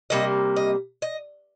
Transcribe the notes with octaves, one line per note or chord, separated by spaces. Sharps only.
C3 G3 A#3 D#5
D#5
D#5